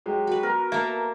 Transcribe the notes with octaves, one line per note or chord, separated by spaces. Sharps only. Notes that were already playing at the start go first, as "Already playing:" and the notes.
F#3 G#3 G4
F#4 B4
B3 A#4
A#3 A4 A#4 E5 A5